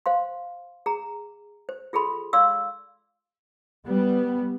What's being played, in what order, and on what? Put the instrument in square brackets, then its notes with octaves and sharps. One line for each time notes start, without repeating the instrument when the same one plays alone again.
[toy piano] C5 F5 C6
G#4 A#5
C5
F4 G#4 A4 B5 C6
D5 F5 C6 D6 E6
[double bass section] G3 B3